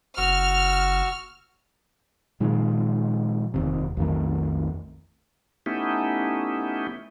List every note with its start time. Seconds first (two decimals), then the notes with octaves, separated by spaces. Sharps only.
0.18 F#1 F#4 C#6 E6 F6
2.40 A#2 D#3 F3 G#3
3.54 F1 D#2 C3
3.97 B1 F2 D#3 A3
5.66 A3 B3 C#4 D#4 E4 G4